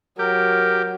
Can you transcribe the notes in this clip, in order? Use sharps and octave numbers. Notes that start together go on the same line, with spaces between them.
F#3 G4 A#4